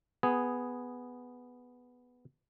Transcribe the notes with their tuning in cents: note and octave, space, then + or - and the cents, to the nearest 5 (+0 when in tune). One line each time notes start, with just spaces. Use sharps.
B3 +0 G#4 +0